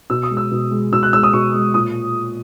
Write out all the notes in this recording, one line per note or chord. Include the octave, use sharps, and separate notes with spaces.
B2 E6
D#6
G#3
E6
B2
G#3
B2 E6
F#6
G#3 E6
D#6
B2 C#6
G#3
A#2 D#6